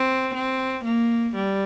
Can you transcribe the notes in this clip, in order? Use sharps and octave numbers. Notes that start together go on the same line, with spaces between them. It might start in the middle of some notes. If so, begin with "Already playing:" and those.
Already playing: C4
C4
A#3
G3